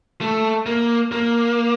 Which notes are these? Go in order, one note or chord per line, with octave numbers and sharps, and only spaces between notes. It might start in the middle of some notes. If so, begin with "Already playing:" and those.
A3
A#3
A#3